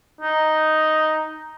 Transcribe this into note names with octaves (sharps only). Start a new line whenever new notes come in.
D#4